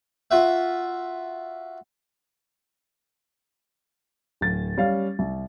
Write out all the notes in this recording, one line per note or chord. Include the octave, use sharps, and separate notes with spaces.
F4 F#4 E5
D1 A6
G3 C#4 F5
C2